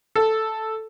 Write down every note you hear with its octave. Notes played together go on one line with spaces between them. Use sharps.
A4